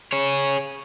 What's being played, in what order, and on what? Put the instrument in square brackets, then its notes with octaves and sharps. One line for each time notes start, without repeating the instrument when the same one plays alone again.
[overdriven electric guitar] G#4 C#5